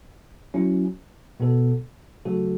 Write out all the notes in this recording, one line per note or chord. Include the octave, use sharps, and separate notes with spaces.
F#3 C#4 E4
B2 B3 A4
C#3 F#3 A3 F#4 A4